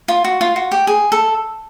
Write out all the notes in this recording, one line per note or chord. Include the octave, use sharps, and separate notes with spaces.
F4
F#4
F4
F#4
G4
G#4
A4